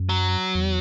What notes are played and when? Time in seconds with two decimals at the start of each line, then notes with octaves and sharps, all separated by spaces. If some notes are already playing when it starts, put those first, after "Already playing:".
Already playing: F#2
0.09 F#3
0.55 E2